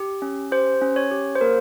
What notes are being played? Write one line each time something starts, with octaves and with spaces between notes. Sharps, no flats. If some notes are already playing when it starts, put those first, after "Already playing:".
Already playing: G4
C#4
G4 C5
C#4
C#5
G4
C5
A#3 A#4